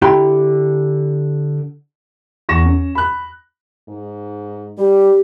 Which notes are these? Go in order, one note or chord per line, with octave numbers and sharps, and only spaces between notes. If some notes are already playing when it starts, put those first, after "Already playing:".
D3 E4 G4 G5 A#5 C6
E2 C#6 A#6 E7
C#4
B5 F#6
G#2
G3 G4